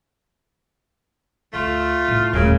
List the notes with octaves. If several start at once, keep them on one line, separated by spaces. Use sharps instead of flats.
D2 A3 F4
A2
D#1 F#2 C#3 A3